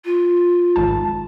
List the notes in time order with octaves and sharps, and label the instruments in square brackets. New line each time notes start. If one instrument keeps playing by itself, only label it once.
[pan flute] F4
[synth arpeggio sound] G#1 A5